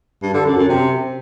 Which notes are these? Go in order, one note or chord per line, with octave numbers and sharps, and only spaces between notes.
G2
D3
F#2
F#2
C3